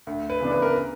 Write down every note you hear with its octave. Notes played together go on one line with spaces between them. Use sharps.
D2
B4
C#3 E3 B3 D4
B4
A#4